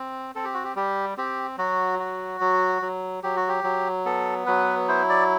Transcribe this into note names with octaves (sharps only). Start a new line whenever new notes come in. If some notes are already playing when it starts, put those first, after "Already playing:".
Already playing: C4
C4 A4
G4
F#4
G4
G3 G4
C4 G4
F#3 F#4
F#4
F#3
F#3
F#3 G4
F#4
G4
F#3
B3 A4
F#3 B4
E4 C5
D5